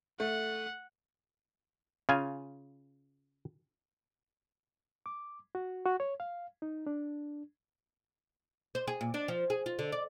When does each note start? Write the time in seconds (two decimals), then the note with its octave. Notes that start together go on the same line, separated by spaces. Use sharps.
0.20 A3 F#5
2.09 C#3 F4 G#5
5.06 D6
5.55 F#4
5.86 F#4
6.00 C#5
6.20 F5
6.62 D#4
6.87 D4
8.75 C5
8.88 G#4
9.01 A#2
9.14 D4
9.28 F3
9.50 G#4
9.66 F4
9.79 D3
9.92 D5